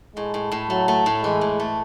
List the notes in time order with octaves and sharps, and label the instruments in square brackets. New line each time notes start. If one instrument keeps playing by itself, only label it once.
[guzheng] A2 [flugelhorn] G#3
[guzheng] A2
A2
[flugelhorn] F#3 [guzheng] A3
[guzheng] A3
A2
[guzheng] E3 [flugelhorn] G#3
[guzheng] A2
A3